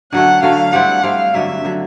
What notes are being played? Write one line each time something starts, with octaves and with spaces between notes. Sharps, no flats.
D3 F#3 A3 F#5
D3 F#3 A3 F5
G3 C4 E4 F#5
G3 C4 E4 F5
G2 D3 F#3 E5
D3 F#3